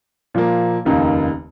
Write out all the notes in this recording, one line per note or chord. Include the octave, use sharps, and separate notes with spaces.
A#2 F3 A#3
F1 D#2 C#3 A#3 D#4